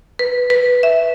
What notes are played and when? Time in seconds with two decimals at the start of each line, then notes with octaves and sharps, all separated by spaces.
0.19 B4
0.50 B4
0.83 E5